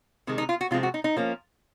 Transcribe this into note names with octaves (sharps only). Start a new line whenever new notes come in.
C3 D#3 G#3
D#4
F4
F#4
C3 F3 G#3 C4 F4
F#4
D#4
D#4
F3 A#3 C#4